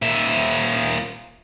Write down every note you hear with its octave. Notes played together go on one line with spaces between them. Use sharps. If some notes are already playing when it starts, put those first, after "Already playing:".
A#2 E5